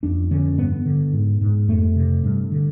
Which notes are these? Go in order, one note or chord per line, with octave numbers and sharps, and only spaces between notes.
F2 D4
D3 C#4
G2 B3
D3
G#2
G#2
F2 A3
C3
G2
D3